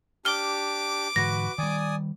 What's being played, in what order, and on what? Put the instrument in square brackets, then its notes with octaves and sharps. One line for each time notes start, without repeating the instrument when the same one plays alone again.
[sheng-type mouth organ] D4 G4 [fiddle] D6 [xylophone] F6 G7
[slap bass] G#2 D3 E3 [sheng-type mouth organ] F#4 B4 [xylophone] A#6
[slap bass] D#3 G3 [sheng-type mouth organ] D5 G#5 D#6